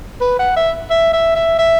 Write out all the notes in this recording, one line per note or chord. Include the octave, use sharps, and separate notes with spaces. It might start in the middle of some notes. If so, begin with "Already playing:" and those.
B4
F#5
E5
E5
E5
E5
E5